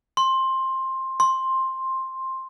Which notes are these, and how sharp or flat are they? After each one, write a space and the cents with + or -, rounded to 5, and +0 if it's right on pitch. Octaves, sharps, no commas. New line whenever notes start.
C6 +15
C6 +10